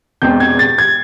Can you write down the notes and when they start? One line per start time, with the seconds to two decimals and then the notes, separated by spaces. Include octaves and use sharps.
0.22 E1 E2 B2 G#3 C4 G6
0.40 G#6
0.59 A6
0.78 G#6